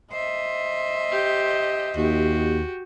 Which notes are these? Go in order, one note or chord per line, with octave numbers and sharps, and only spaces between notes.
C5 D#5 E5
G4
D#2 F#4 G4